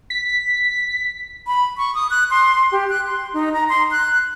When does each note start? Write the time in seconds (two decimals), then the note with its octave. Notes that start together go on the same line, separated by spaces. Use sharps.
0.10 B6
1.47 B5
1.78 C#6
1.95 D#6
2.10 F#6
2.30 C6
2.72 G4
2.89 F#6
3.07 C6
3.34 D#4
3.54 A#5
3.69 C6
3.91 F#6